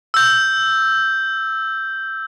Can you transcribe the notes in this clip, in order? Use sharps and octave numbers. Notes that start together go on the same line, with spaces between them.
E6 G6